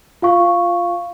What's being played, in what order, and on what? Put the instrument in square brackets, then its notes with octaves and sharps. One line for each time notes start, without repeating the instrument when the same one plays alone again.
[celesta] F4 F5 C#6